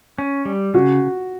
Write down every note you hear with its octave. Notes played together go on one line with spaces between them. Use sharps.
C#4
G3
C#3 F#4